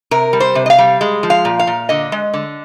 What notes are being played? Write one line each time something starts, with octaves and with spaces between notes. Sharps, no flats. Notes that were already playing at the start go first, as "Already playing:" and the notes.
C3 A#4
G3
C5
C3
D#5
F5
G3
G#3
F3
F5
A#2
F5
A#2
D3 D#5
G#3
D3